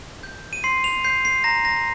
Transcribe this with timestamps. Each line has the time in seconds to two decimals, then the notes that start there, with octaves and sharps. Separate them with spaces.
0.23 G6
0.53 D#7
0.64 C6 C7
0.84 F7
1.04 G6 C7
1.25 C7
1.44 A#5 A#6
1.65 A#6